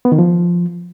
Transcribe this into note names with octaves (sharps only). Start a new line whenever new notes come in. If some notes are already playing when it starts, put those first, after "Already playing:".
B3
D#3
F3